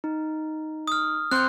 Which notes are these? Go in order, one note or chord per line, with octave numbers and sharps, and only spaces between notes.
D#4
D#6 F6
C4 C5 C6 F#6 G6